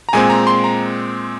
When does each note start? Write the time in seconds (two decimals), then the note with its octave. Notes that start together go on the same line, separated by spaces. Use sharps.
0.09 A#5
0.13 A#2 G#3 C4 G#5
0.30 A#5
0.47 C6
0.64 A#5